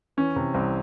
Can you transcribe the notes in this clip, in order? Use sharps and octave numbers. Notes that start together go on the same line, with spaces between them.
E3 C#4
C3
C2 C4